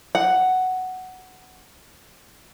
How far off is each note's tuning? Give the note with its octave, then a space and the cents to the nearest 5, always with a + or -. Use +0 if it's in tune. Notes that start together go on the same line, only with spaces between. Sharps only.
F#5 +5